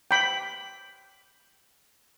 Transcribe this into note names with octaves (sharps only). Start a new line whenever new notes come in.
G5 B5